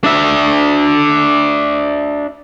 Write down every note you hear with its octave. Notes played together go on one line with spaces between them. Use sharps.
D4 E5